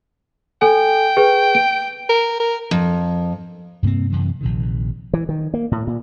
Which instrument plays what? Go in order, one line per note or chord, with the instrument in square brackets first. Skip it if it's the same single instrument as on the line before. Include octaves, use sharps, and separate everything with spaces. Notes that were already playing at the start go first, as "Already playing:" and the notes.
[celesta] A4 G#5 [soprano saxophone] G5
[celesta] G#4 B4
D7
[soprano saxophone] A#4
A#4
[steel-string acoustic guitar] F2
[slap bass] G2 C3 A#3 C4
F#2 C3 E3 C4
A#1 C3 D#3
E3
D#3
A#3
A2
A#2